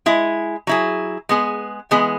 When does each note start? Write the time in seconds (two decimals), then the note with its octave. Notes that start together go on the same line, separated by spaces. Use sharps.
0.06 G#3 E4 G#4
0.67 F#3 E4 G#4
1.29 G#3 B3 G#4
1.91 E3 G#3 B3 G#4